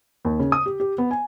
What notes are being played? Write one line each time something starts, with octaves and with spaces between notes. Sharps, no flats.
D#2
C#3
D#6
G4
G4
B3
G#5